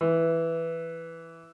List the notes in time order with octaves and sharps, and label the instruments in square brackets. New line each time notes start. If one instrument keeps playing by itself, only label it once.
[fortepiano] E3